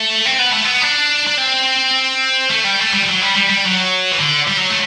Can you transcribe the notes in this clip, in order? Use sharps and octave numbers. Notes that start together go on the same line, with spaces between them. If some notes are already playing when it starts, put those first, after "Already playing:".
Already playing: A3
C4
B3
A3
B3
D4
D4
C4
A3
G3
A3
G3
E3
F#3
G3
G3
G3
F#3
E3
D3
G3
F#3
A3